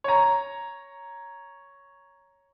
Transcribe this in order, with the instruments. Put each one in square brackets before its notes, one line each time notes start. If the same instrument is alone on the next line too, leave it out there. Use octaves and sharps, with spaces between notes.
[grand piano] C#5 A#5